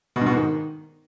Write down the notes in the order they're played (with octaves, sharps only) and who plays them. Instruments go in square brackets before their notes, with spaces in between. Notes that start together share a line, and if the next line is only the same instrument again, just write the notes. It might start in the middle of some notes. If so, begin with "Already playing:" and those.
[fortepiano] B2
G2
B2
G#2
D#3